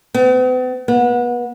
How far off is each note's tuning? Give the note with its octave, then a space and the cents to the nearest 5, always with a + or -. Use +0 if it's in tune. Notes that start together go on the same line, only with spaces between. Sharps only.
B3 +45
B3 -30